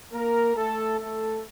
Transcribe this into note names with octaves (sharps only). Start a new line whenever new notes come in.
A#3 A#4
A3 A4
A3 A4